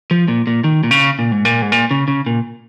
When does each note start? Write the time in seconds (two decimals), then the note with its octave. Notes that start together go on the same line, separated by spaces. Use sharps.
0.11 F3
0.28 A#2
0.47 A#2
0.64 D#3
0.83 A#2
0.91 C#3
1.19 A#2
1.32 G#2
1.45 A#2
1.62 G#2
1.72 A#2
1.91 C#3
2.08 C#3
2.26 A#2